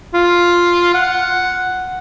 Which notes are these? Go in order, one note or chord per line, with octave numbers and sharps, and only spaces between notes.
F4
F#5